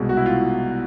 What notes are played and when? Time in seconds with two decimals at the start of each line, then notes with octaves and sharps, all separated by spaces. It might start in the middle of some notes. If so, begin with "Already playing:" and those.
Already playing: C2 B2 G#3
0.09 F#4
0.17 E4
0.26 F4